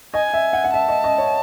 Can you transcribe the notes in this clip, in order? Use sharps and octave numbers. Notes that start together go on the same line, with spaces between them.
D#5 G#5
E5
F#5
F#5
E5 A5
D#5
D#5
C#5